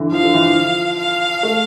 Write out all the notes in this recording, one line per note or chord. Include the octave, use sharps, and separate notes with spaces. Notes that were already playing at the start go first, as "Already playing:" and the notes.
Already playing: D3 E3
F3 F5
D3
E3
F3
F5
A3